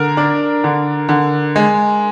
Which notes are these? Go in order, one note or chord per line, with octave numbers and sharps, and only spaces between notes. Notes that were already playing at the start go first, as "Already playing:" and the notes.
Already playing: D3 A#4
D4
D3
D3
G#3